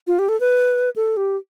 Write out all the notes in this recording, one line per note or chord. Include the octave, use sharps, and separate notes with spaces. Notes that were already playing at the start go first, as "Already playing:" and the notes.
F4
G4
A4
B4
A4
G4